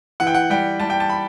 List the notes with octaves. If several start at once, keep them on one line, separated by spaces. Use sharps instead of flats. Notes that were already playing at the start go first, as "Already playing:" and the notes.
E3 F#5
G5
F#5
G3 G5
G3 A5
G5
A5
B5